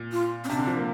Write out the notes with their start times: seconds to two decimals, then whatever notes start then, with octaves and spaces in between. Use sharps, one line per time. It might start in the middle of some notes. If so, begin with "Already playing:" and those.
Already playing: A#2
0.12 F4
0.44 C4
0.49 C3 D4
0.59 D3
0.67 F3
0.77 A#3